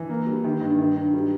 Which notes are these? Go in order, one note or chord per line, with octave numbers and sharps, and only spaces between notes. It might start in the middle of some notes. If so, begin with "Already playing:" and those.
Already playing: E3
A#3
G3
D#3
G2
D#3
G2
G3